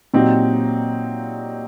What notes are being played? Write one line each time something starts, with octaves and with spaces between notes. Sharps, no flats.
A#2 F#3 C4 D#4 G4